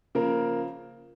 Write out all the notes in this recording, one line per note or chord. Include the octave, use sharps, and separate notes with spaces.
C#3 F3 A#3 A#4